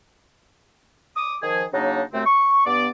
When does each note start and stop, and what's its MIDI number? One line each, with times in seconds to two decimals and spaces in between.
1.16 1.36 86
1.16 1.36 87
1.42 1.65 51
1.42 1.65 53
1.42 1.65 68
1.73 2.03 49
1.73 2.03 54
1.73 2.03 58
1.73 2.03 62
1.73 2.03 63
2.13 2.22 42
2.13 2.22 48
2.13 2.22 57
2.13 2.22 60
2.26 2.62 85
2.66 2.88 43
2.66 2.88 59
2.66 2.88 74